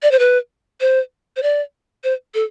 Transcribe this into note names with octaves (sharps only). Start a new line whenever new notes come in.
D5
C5
B4
C5
C5
D5
C5
A4